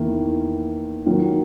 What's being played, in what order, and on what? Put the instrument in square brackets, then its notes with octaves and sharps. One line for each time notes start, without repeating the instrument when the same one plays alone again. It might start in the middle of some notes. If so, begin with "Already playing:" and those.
Already playing: [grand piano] E2 D#3 A#3 E4
D#3 F#3 A#3